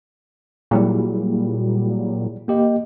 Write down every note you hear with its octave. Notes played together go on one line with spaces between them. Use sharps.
A#2 F#3 G3 E4 G#4
A#3 G4 D#5